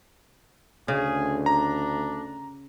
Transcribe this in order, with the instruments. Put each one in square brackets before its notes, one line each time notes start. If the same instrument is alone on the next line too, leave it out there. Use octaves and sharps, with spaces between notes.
[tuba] D2 [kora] C#3 [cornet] G#4
[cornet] D4 [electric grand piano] A#5